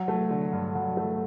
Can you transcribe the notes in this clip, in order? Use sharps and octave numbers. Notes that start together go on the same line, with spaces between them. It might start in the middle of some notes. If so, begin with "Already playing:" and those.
Already playing: F#3
A3
D3
G2
F#3
A3